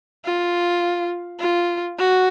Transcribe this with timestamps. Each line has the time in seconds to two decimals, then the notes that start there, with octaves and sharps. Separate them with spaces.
0.25 F4
1.40 F4
1.98 F#4